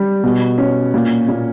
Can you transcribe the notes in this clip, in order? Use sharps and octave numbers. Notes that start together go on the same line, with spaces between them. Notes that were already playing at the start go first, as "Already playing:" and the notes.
Already playing: G3
B2
C#4
A#2
A#2